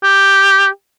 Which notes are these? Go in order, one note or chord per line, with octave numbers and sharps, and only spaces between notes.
G4